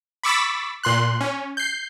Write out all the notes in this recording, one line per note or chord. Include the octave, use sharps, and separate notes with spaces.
B5 C#6 D6 E6 A6 B6
A#2 C6 F#6
C#4
G6 C7